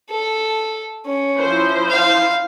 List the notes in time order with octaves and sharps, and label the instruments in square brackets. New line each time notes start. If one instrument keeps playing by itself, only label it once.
[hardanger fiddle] A4
C#4
[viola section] F3 E4 C5
[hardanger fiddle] F5